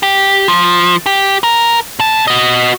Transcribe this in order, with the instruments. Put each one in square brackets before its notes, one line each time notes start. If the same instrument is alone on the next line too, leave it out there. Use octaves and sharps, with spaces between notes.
[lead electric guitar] G4
F3
G4
A#4
B2 A5
F#4 D#5